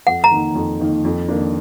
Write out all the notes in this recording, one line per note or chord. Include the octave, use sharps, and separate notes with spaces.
F2 F#5
A#5
D#3 A#3 D#4
F2
D#3 A#3 D#4
F2
D#3 A#3 D4